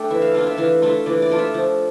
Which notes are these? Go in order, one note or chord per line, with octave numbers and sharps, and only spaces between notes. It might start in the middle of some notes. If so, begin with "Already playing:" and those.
Already playing: A3 D4 A4 G5
E3 E5
F5
A3 D4 F4 F5
E5
E3 F5
A3 D4 F4 E5
E3 D5
D5
A3 D4 F4
E5
F3